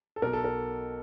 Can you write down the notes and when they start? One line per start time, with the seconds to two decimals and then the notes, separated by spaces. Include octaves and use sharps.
0.16 A4
0.22 B1 B2 A#4
0.33 A4
0.44 A#4